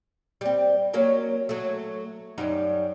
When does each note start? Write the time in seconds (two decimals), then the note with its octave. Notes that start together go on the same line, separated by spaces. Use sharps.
0.41 G3 C4
0.93 F#3 A#3 C#4
1.49 F#3 A3
2.38 F#2 G3 D#4